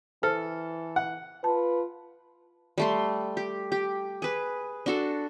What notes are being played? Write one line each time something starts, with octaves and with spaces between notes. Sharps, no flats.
E3 A4 C5 F6
F#5
F4 B4 A5
G3 A3 C6
G4
G4
G#4 B4
D4 F#4 A4